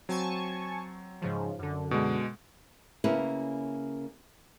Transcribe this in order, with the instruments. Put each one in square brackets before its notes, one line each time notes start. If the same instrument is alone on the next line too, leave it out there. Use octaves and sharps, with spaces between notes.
[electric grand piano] F#3 C4 [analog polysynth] G#5 A5 C#6
[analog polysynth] G#2 C#3 F3
F#2 D3
[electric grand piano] B2 G#3
[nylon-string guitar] C#3 A#3 C#4 E4 A#4 B4